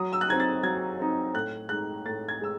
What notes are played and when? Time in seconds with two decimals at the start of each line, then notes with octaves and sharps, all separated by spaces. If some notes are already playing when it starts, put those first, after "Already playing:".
Already playing: F#3 D#6
0.13 E6
0.21 F#6
0.29 C4 D#4 G#6
0.40 A6
0.63 F#3 G#6
0.99 C4 D#4
1.34 A2 F#6
1.69 G#3 D#4 F#6
2.05 A2 A6
2.29 G#6
2.41 G#3 E6